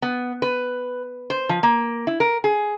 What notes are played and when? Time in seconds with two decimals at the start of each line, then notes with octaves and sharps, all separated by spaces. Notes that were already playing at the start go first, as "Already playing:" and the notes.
0.02 B3
0.42 B4
1.30 C5
1.49 F3
1.63 A#3
2.07 E4
2.20 A#4
2.44 G#4